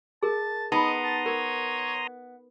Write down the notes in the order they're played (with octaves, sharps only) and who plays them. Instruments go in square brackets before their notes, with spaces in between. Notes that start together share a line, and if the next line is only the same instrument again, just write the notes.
[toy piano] G#4 A#4 [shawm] A5
[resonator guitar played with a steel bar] B3 [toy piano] D#4 [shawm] D#5 [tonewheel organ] A#5 C6 D#6
[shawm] A5
[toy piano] A#4 [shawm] C#5